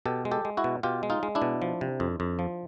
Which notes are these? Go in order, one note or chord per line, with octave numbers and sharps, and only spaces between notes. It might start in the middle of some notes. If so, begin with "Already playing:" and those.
B2 G4 A4
G#3
G4 A4
G#3
E4 F#4
B2
B2 F4 G4
G#3
D#4 F4
G#3
D4 E4
B2
F3
C3
F2
F2
F3